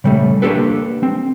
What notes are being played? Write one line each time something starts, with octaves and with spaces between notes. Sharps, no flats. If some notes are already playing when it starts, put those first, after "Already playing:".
C#3 G3 A3
A#3 D4 D#4 G4 A4 B4
C4